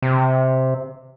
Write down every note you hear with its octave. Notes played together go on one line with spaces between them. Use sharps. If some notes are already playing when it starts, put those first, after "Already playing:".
C3